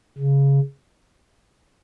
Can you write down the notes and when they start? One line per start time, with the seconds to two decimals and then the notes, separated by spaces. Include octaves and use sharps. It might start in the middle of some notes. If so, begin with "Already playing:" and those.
0.18 C#3